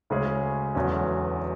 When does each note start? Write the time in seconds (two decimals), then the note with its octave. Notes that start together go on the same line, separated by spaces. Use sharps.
0.10 D2 C#3 G#3 C#4 G#4
0.75 E1 E2 D3 F#3 C#4